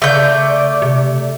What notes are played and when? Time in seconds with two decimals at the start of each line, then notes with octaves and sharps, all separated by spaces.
0.02 C#3 A3 D5 G6
0.82 C3